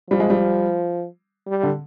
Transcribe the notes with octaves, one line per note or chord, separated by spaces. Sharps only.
F3 G3
G#3
G3
G3
D3